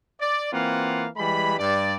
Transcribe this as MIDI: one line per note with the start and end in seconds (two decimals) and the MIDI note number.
0.19 0.51 74
0.52 1.06 52
0.52 1.06 58
0.52 1.06 60
0.52 1.06 65
0.52 1.06 77
0.52 1.06 78
1.17 1.56 52
1.17 1.56 55
1.17 1.56 56
1.17 1.56 83
1.59 1.96 43
1.59 1.96 74